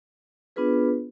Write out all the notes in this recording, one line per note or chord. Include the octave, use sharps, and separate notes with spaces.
B3 D4 F4 G#4 B4